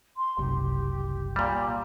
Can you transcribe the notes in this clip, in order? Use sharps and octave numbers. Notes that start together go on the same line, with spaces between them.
C6
F#1 C2 G4
A#2 G3